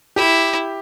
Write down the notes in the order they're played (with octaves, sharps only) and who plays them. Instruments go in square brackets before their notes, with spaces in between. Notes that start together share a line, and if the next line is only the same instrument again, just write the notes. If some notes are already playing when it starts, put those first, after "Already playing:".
[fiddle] E4 [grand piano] G4